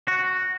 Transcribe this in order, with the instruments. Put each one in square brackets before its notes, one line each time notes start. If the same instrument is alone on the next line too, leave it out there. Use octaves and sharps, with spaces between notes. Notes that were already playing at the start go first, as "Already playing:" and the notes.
[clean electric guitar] F#4